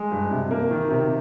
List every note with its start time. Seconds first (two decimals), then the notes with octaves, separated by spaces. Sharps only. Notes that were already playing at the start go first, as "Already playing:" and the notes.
Already playing: G#3
0.12 G2
0.31 C3
0.51 A#3
0.71 D#3
0.90 C3